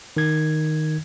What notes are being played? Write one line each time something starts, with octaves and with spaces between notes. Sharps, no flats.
D#3 G#6